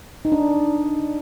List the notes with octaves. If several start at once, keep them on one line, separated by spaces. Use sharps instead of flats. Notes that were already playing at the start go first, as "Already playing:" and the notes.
D#4
D4